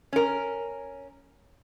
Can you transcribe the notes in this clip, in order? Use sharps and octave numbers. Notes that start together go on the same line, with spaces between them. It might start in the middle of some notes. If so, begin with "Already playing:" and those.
C#4 A#4